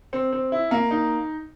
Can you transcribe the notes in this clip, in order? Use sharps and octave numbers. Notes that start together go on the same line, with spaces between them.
C4
C4
E4
A#3
D#4